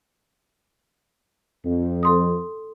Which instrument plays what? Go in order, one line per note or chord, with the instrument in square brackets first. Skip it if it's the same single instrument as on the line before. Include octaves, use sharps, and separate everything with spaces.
[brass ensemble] F2
[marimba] A4 C6 D#6